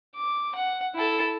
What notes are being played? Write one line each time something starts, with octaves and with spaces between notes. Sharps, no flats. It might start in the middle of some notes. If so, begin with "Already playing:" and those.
D6
F#5
E4 A4